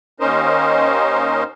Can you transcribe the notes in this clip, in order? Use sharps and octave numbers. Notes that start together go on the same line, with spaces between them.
D#2 C#4 D#4 A#4 C5 D#5